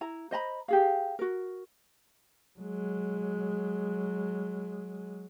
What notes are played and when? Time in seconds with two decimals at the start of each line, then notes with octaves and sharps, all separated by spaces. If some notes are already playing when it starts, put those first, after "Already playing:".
0.01 E4 A#5
0.31 C5 D#5 A#5 B5
0.68 G4 G#4 F5
1.19 F#4 A#4
2.59 F#3 G#3